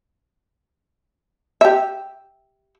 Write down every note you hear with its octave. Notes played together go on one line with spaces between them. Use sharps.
G4 E5